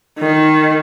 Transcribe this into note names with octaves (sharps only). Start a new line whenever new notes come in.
D#3